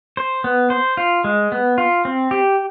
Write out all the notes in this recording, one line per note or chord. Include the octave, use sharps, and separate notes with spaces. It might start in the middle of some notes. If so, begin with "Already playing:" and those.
C5
B3
C5
F4
G#3
B3
F4
C4
G4